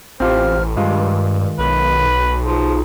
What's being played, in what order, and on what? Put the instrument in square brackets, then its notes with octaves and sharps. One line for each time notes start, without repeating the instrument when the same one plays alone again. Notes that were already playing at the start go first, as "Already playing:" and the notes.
[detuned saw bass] A1 [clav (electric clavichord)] C4 F4 G4 [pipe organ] C5 F6
[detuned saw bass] G2 [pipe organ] D#3 [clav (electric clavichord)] G#3 F4
[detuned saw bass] B1 [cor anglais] B4
[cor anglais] F3 [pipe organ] D#4 F4 G#4